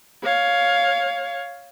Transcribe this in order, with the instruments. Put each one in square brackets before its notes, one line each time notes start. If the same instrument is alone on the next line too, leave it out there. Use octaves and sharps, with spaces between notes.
[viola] C#5 F5